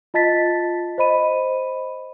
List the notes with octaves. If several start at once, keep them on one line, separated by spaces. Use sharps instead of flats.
F4 D#5 A5 A6 B6
C5 D#5 B5 D#7